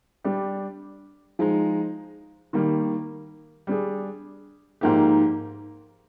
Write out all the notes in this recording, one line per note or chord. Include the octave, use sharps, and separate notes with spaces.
G3 D4 G4
F3 G#3 D#4
D#3 G3 A#3
G3 D4 G#4
G#2 F3 A#3 D#4 G4